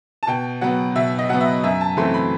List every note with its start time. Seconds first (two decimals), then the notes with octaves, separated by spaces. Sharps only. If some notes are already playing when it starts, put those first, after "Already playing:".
0.23 A5
0.27 B2 G5
0.61 F#3 B3 F#5
0.96 B2 E5
1.19 D#5
1.29 F#3 B3 F#5
1.41 E5
1.64 F#2 E5
1.81 A5
1.97 E3 A3 C4 C6
2.14 B5